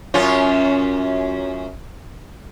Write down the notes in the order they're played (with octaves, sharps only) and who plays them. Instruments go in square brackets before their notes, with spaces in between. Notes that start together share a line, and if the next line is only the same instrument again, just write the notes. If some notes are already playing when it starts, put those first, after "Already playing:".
[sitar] F#2 C#4 F4